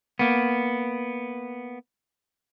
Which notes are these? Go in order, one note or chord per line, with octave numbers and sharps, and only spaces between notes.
A#3 B3